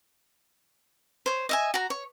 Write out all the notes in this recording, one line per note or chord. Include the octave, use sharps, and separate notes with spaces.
C5 C#5
D#5 E5 G#5
F#4 A#5
C#5